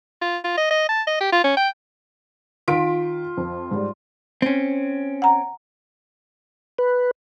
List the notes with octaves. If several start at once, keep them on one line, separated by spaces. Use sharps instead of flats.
F4
F4
D#5
D#5
A5
D#5
G4
F4
C#4
G5
D#3 F4 B6 D7
F2
G#2 G3
C4 C#4
F#5 A#5
B4